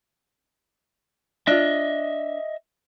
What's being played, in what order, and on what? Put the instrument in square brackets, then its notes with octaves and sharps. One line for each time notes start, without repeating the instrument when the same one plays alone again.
[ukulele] D4 F4 [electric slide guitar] D#5 E5